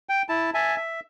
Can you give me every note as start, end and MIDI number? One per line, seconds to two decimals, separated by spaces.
0.09 0.22 79
0.29 0.50 64
0.29 0.50 81
0.54 0.76 76
0.54 0.76 80
0.54 0.76 81
0.76 1.00 76